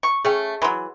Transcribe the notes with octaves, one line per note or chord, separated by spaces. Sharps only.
C#6
A3 C#4 G#4 G5
E3 F#3 B5 C6